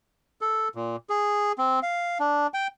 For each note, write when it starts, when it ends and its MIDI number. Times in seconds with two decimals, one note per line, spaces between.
0.41 0.68 69
0.75 0.96 46
1.10 1.52 68
1.58 1.80 60
1.83 2.18 77
2.20 2.47 62
2.54 2.67 79